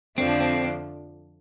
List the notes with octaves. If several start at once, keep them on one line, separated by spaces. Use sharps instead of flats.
F2 D3 F3 A3 C4 D4
C4